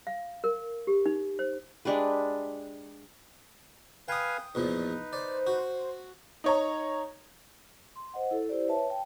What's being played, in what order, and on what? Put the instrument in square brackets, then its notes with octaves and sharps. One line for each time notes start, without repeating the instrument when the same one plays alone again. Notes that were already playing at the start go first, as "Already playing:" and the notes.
[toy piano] F5
A#4
G4
D#4
C5
[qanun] G#3 D4 G4 B4
[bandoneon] B4 F5 G#5 [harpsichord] G5 D#6
[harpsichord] E2 A#2 F3 [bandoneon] D#4 B4
[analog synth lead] C5 [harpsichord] D5
[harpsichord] F#4
[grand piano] D#4 C#5 A#5
[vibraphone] C6
C5 D#5 F#5
E4 A4
E4 G4 C5 D5
B4 C#5 E5 A5
G5 A5